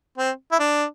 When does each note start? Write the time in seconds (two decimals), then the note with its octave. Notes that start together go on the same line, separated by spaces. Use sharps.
0.18 C4
0.51 E4
0.59 D4